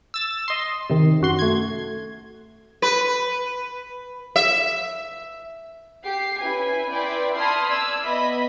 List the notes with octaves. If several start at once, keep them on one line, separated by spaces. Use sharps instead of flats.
E6 A6 E7
D#5 C6
C3 D#3
F#2 F#4 C6
A3 G#6
B4
E5
G4 C7
C#4 E4 B4 G#5
E4 B4 D5 G5 C6
A5 B5 C6 D#6 F6 G#6
D5 E6 G#6
B3 D#5 E5 B5